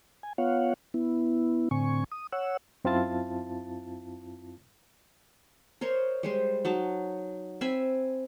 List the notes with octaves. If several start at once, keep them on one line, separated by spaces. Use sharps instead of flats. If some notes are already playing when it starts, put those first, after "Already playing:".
G#5
B3 F4 C#5 F5 F#5
B3 E4
A2 D3 C4 G#5 C#6
D#6
C#5 F#5 E6
F#2 C4 E4 F4 A5 A6
A#4 C5 C#5 D#5
G3 G#3 C5
F#3 D#4 A5
C4 E5 G#5 B5